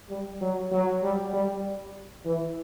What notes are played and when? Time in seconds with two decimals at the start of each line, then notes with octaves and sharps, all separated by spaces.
0.10 G3
0.41 F#3
0.72 F#3
1.03 G3
1.33 G3
2.26 E3